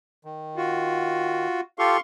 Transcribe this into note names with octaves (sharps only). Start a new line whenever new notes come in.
D#3
F4 F#4
F4 G4 A4 F5 C6 C#6